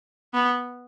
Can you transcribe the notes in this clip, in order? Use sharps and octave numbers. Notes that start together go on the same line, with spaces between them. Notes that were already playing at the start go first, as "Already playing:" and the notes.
B3